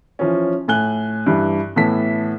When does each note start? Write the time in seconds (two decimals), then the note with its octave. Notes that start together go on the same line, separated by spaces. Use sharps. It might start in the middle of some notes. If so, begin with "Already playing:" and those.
0.19 E3 F3 C#4
0.68 A2 G#5 F#6 G7
1.26 G2 E3
1.76 A2 E3 B3 A5 B6